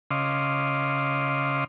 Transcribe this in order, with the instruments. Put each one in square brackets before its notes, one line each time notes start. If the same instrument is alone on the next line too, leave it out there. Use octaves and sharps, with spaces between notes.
[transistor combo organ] C#3 D#5 F5 C6 D6